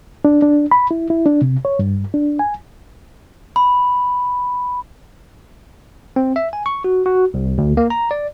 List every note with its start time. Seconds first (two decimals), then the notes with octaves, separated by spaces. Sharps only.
0.25 D4
0.42 D4
0.71 B5
0.91 E4
1.10 E4
1.26 D4
1.42 C3
1.65 C#5
1.79 G2
2.14 D4
2.39 G#5
3.56 B5
6.16 C4
6.36 E5
6.53 G#5
6.66 C#6
6.84 F#4
7.06 F#4
7.34 C2
7.58 D2
7.77 A#3
7.90 A#5
8.11 D5